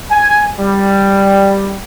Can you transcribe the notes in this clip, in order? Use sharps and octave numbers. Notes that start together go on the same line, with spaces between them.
G#5
G3